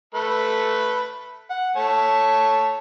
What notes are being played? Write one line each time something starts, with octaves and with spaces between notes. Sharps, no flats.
A3 A4 B4
F#5
A3 C#5 A5